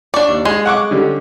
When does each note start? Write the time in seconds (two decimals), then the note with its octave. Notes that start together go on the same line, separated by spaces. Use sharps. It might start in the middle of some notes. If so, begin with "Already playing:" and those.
0.14 D4 D5 C#6
0.29 D#2
0.45 G#3 C6
0.66 F#5 C#6 D6
0.91 D3 G3 C#4